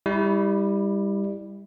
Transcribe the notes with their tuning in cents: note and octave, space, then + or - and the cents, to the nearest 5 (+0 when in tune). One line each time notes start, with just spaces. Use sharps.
G3 +20 E4 -15